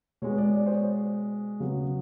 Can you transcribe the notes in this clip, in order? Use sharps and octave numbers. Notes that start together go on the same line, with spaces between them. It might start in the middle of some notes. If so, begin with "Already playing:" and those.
B2 G#3 B3 C#5
D5
D5
C5
C#5
C#3 F#3 B3